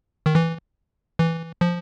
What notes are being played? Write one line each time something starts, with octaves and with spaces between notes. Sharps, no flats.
D#3
E3
E3
F3